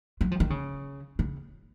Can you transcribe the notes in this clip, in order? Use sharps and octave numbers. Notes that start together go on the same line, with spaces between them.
F#3
F3
D#3
C#3
C#3